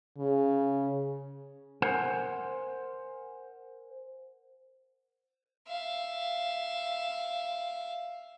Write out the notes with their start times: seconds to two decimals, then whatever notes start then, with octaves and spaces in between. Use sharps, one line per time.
0.18 C#3
1.82 A#4 C5 F#5 G#5
5.68 E5 F5